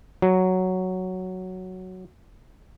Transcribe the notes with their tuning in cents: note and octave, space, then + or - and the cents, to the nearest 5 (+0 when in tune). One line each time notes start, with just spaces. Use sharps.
F#3 +0